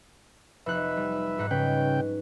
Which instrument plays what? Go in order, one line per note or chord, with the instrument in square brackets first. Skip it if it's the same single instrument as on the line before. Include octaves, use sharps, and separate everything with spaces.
[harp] F1 D#4 F#6 [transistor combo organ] B4 E5
[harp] G3
G#2 D#4 F#6
[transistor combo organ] C#3 G5 [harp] C#4 B4